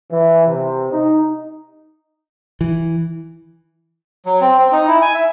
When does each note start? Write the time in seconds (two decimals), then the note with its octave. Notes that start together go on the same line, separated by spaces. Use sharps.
0.11 E3
0.46 C3
0.91 D#4
2.61 E3
4.26 F#3
4.41 C4
4.58 C4
4.72 D#4
4.88 E4
5.02 G#5
5.15 E5